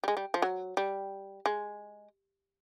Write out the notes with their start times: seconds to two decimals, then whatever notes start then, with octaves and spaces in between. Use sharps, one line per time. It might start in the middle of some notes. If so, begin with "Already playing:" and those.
0.04 G3
0.08 G#3
0.17 G3
0.34 F3
0.42 F#3
0.77 G3
1.46 G#3